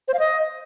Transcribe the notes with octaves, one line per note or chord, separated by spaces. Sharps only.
C5
F5
D#5